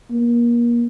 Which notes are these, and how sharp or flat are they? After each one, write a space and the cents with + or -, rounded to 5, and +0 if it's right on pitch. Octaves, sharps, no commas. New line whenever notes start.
A#3 +30